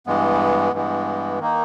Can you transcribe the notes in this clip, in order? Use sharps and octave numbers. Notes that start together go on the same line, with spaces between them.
G2 E3 G#3 B3
G2 E3 G#3 B3
D#3 A#3 D#4